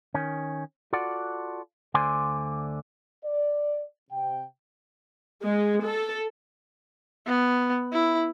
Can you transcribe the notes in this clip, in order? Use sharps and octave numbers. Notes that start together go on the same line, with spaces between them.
D#3 C#4
F4 F#4 A4 D5 F#5
D2 D3 C5 D5 G#5 C6
D5
C3 G5
G#3
A4
B3
E4